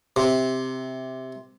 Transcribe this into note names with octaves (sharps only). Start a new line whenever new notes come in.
C3